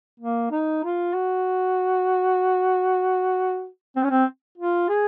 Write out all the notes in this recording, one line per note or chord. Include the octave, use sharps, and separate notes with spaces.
A#3
D#4
F4
F#4
C4
C#4
C4
F4
G#4